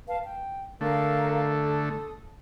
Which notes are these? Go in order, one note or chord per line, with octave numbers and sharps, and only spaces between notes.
B4 F5 A5
G5
D3 A3 A#4 F5 A#5
A4 D#6